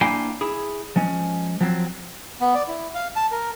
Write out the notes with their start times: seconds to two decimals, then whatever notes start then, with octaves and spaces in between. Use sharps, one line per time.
0.01 A#3 D4 E4 F5 G5 G#5
0.41 E4 G#4
0.96 F3 G#3 C#4
1.61 F3 F#3 C4
2.40 B3
2.55 D5
2.68 E4
2.95 F5
3.16 A5
3.32 A#4